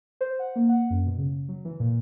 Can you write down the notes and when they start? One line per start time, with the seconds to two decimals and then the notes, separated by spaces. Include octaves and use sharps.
0.21 C5
0.39 F#5
0.56 A#3
0.69 F#5
0.90 F#2
1.06 B2
1.18 C#3
1.49 F#3
1.65 E3
1.80 A#2